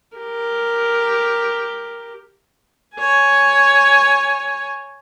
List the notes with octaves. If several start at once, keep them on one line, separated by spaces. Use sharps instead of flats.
G4 A#4
C#5 G#5